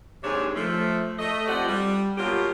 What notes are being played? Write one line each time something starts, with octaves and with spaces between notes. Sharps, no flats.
D#2 G#2 C3 D4 G#4 C#5
F3 A3
A3 D#5
F2 F3 G4 D5 F#5
G3
B2 F#3 A#3 F4 G4